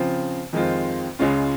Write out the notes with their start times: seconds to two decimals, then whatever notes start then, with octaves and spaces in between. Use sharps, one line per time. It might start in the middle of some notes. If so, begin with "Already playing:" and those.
Already playing: C#3 F3 C4 F4
0.53 F2 D#3 G#3 C4 F4
1.19 C#2 C#3 G#3 C#4 F4